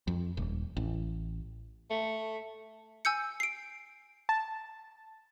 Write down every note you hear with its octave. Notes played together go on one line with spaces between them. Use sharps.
F2
D#1
A1
A3
G#5 E6 G6 C#7
C7 D7
A5